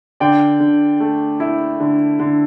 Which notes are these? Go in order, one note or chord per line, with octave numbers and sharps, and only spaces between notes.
D3 D5 G5
D3
A3
E4
D3
D3